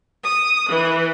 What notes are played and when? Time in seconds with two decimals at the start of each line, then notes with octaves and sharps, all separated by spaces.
0.24 D#6
0.70 E3